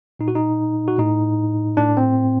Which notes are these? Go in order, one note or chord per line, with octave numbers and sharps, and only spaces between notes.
A#2 D#4
F#4
D#4
F#4
A2 D#4
A2 D4
C4